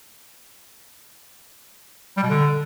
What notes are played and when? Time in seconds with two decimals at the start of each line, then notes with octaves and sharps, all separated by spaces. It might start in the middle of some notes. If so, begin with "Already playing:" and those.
2.17 G3
2.23 B2
2.29 D3